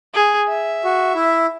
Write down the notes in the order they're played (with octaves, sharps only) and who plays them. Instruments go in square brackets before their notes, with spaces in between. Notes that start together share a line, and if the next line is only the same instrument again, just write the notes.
[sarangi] G#4
E5
[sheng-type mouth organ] F#4
E4